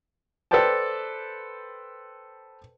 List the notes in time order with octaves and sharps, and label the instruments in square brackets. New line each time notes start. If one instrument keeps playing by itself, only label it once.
[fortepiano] A4 B4 C5 D5 G5 A5